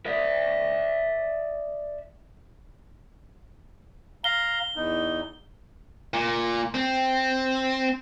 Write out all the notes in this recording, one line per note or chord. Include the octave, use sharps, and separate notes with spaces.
D5 E5
F5 A#5 G7
E2 D#4
A#2
C4